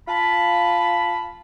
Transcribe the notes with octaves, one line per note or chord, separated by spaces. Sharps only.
F4 A5 B5